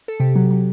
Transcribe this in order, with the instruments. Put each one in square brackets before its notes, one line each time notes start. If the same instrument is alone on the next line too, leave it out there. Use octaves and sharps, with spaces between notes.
[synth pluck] A4
C3 G4
F#3
F#3